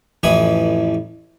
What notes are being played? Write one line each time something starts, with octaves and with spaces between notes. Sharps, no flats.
A1 F2 E3 B4 G#5 D#6